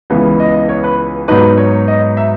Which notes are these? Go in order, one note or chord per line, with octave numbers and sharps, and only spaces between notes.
C#2 C#3 E3 B3
D#5
C#5
B4
G#2 F#3 B3 D#4 B4
C#5
D#5
E5